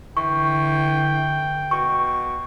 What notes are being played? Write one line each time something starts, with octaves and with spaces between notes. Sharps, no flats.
D3 E3 G5 C#6
B2 C#6